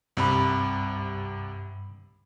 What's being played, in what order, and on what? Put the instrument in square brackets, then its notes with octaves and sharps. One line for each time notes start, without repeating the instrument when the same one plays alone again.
[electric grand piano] C2 C3 [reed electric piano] G2 B5